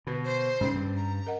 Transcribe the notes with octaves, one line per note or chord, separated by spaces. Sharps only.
B2 D3 B4
C5
G#2 C3 D#3 C#4
G2 G3
A#5
A#4 D#5 F#5